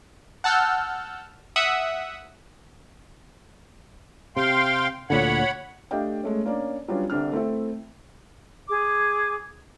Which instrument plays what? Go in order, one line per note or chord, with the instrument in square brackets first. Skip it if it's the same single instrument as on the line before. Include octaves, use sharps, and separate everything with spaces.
[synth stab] F#5 A5 E6 F6 G6
E5 F#5 D#6
[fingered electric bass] C3 [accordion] F5 G5 C6
[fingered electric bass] D2 A#2 D3 [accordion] C#5 F#5 B5
[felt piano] A3 D4 G4 D#5 F5 G5
G#3 A3 C#4
A#3 C#4 D4 D5
F#3 G3 B3 C#4 D4 F4
C2 D3 C4 D4 F6
A3 C4 E4 A4 E5
[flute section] G#4 D6